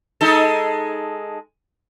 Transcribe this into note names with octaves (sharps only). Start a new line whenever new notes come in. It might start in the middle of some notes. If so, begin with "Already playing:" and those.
G#3 D#4 A4